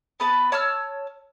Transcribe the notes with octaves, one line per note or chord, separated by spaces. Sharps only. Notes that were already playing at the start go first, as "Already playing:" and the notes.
B3 B4 A5
C#5 A5 E6 F6